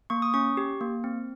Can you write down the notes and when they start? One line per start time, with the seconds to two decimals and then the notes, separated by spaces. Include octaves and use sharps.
0.10 A#3 C#6
0.22 D#6
0.34 C#4 C#6
0.57 G4
0.81 A#3
1.04 C4